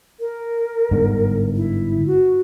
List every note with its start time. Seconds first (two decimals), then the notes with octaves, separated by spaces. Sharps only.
0.20 A#4
0.91 G1 G#2 D3
1.56 E4
2.07 F#4